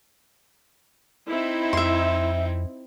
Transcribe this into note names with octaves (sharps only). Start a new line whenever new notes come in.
C4 D#4 E4
F2 E5 C6